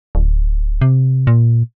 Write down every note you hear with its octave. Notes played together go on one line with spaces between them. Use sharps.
D1
C3
A#2